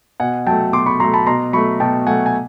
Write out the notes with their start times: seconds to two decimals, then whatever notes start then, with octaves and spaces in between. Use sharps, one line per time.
0.20 B2 F#5 G#5
0.47 F#3 G5 A5
0.50 A3
0.73 B2 C6 D6
0.86 B5 C#6
1.00 F#3 A#5 C6
1.04 A3
1.14 A5 B5
1.26 B2 A#5 C6
1.53 F#3 A3 B5 C#6
1.80 B2 G5 A5
2.07 F#3 A3 F#5 G#5
2.26 G#5